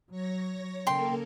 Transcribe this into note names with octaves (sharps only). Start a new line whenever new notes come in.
F#3 C#5 A#6
C#3 A#3 A4 A#4 G5 C6